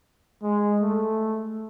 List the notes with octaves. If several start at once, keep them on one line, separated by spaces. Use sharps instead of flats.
G#3
A3